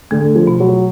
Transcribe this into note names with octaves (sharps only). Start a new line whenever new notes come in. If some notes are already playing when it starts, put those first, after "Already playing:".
D3 A3
F3
B2
F#3